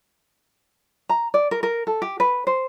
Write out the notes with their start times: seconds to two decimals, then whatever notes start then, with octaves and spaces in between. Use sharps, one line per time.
1.09 A#5
1.34 D5
1.51 A#4
1.63 A#4
1.87 A4
2.02 G4
2.20 B4
2.47 C5